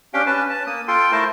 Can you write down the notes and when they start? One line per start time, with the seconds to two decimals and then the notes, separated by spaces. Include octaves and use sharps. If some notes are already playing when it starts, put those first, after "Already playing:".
0.14 C#4 D4 G4 F5 G5
0.26 C#4 B4 A5
0.50 A5
0.67 A#3 D#6
0.88 F4 A4 G5 C6
1.12 A3 E4 A#4 C5 A5